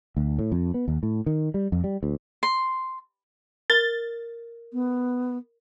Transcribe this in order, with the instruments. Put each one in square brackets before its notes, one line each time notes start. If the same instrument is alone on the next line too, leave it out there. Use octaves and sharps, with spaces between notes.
[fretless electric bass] D2
A2
F2
B3
D#2
A2
D#3
G3
F2
G3
D2
[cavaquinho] C6
[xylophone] A#4 [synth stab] A6
[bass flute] B3